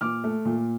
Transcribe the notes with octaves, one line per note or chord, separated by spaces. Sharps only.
A#2 D6 F6
A3
A#2